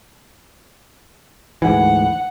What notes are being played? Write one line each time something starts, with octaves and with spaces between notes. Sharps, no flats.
D2 G#2 E3 F#5